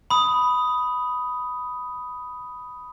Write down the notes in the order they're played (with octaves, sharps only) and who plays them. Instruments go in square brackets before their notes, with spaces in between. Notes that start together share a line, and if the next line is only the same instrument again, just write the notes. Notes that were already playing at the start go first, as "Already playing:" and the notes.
[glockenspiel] B5 D#6